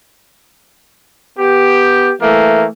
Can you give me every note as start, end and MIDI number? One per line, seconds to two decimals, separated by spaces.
1.38 2.11 59
1.38 2.11 67
2.21 2.65 52
2.21 2.65 57
2.21 2.65 58